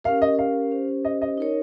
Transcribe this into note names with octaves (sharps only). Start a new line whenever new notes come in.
C#4 G4 A#4 F5
D#5
F5
C#4 G4 C5
D#5
D#5
D#4 A#4 C#5